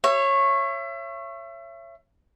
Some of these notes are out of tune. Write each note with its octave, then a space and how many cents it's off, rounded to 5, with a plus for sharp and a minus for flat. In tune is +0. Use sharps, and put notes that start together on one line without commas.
C#5 -15 E5 +35